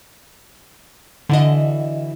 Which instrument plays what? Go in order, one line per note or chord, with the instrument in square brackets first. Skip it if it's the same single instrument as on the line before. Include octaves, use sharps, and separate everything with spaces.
[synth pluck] D3 D#5 [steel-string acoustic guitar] E3 E4 F#4